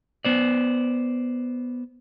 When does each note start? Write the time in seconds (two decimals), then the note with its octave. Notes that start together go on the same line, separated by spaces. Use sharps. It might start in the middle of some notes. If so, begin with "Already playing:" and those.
0.25 B3 C5 D5